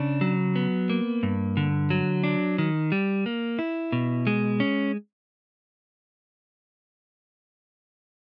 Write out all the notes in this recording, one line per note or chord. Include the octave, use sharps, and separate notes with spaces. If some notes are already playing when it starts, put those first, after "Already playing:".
Already playing: C#3 D4
F#3
B3
A#3
G2
D3
F#3
D4
D#3
G3
A#3
E4
B2
G#3
C#4